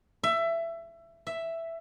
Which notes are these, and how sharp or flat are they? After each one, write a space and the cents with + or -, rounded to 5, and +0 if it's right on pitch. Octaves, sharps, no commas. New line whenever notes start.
E5 +20
E5 +5